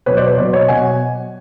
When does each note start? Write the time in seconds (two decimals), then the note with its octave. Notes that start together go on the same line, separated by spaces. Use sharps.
0.06 B2 F#3 B4 C#5
0.17 C5 D5
0.27 B4 C#5
0.37 B2 F#3 C5 D5
0.53 C#5 D#5
0.68 B2 F#3 F#5 G#5